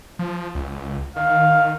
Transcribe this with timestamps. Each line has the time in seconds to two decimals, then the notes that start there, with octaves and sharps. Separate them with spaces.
0.19 F3
0.55 C#2
1.16 D#3 F5